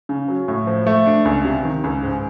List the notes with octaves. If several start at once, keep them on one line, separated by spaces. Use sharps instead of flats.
C#3
F#3
A2
F3
A3
D4
C#2
C3
D#3
C#2
G#2